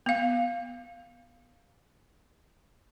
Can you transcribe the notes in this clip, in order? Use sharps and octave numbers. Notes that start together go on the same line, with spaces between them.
B3 F5